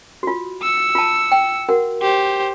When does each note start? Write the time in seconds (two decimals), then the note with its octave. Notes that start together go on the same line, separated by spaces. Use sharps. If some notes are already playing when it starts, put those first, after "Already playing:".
0.23 F4 F#4
0.62 E6 C#7
0.95 F4 A5
1.32 G5
1.69 F#4 A#4 F#5
2.02 G4 C5